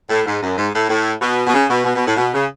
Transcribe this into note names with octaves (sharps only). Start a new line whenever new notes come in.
A2
G#2
F#2
G#2
A2
A2
B2
B2
C#3
B2
B2
B2
A2
B2
C#3